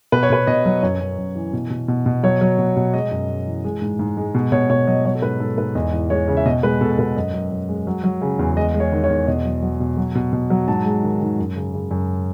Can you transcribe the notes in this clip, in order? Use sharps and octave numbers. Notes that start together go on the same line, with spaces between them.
B2 B4
C#5
B2 B4
B2 D#5
F#3
F#2 C#5
F#2
F#2
E3
B2
B2
B2
B2
F#3 C#5
F#3
B2
B2
G#3 D#5
F#2
G#3
E3
G#3
G#2
G#2
G#3
B2
B2 C#5
B2 C#5
F#3 D#5
F#3 C#5
A4
G#2 B4
G#2 A4
G#2 B4
E2 D#5
E3
G#3 C#5
C#3
E5
B2 D#5
G#3 B4
B2 A4
A4
B2 B4
F#2 D#5
F#2
F#2
G#3
F#3
F#3
C#3
E2
G#3 D#5
G#3
C#5
D#3
C#5
E2
B2 D#5
F#3
F#3
B2
F#3
B2
B2
F#3
G#2 A5
G#3
D#3
D#3
F#2
C#3
C#3
F#2